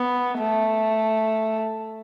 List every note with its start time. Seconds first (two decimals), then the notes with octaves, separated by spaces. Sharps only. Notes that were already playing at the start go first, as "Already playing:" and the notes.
Already playing: B3
0.38 A3